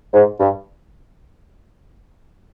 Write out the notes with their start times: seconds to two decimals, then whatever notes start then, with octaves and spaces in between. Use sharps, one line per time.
0.14 G#2
0.40 G2